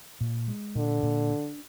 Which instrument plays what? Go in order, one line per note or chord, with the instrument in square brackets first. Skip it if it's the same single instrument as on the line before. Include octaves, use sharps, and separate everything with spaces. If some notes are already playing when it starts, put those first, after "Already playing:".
[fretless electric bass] A#2
G#3
[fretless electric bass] A#2 [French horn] D3
[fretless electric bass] A#2
D4